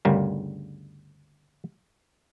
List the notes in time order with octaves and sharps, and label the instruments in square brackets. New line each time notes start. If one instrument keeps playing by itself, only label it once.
[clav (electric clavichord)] G1 D2 C#3 G3 A#4